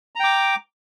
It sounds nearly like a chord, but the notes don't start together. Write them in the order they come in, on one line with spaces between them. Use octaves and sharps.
A#5 G5 D6